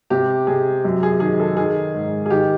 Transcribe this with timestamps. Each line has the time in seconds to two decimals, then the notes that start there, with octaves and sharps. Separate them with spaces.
0.10 C3 G4
0.47 C3 G#4
0.85 F#2
1.03 G#4
1.20 D#3 G#4
1.40 A4
1.57 D#3 G#4
1.94 G#2
2.26 G#4
2.30 D#3 G4